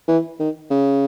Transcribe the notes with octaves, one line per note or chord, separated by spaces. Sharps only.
E3
D#3
C#3